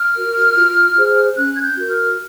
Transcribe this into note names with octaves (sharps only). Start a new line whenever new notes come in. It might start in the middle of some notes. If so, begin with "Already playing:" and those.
Already playing: F6
F#4 A#4
F4
G#4 C5
C#4 F#6
G#6
G6
F#4 A#4
F6